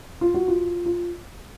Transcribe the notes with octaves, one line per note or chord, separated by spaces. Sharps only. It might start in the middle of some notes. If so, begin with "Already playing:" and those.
F4
F#4
F4
F4